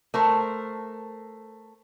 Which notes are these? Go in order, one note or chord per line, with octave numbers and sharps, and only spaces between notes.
A3 A#4 C5